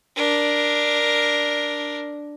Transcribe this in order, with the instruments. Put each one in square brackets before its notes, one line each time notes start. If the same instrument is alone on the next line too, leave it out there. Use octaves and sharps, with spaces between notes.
[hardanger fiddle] D4 A#4